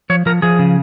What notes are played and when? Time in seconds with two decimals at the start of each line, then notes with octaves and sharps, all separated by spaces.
0.10 F3 C#5
0.26 F3 A#4
0.42 F3 G#4
0.59 C#3